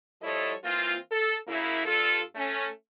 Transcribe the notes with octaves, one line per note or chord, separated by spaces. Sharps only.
F3 G3 E4 A4 C#5 D#5
E3 A#3 C4 F4
A4
F#2 C#3 A#3 E4
G2 F4 A4
A3 C#4